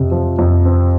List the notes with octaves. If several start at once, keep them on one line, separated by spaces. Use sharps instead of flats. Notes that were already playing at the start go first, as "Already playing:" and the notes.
Already playing: F2 C3 C4
F3
F2
C4